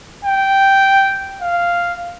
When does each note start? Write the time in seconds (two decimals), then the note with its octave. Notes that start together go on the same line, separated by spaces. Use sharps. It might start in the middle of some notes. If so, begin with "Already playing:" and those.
0.25 G5
1.41 F5